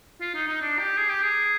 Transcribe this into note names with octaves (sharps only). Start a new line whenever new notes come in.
F4
D#4
D#4
D4
G4
G#4
G4
G#4